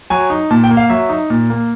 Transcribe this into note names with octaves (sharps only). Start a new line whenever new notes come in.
F#3 G#5
D#4
A#2 A5
G5
A#3
F5
F#3 E5
D#4
A#2
A#3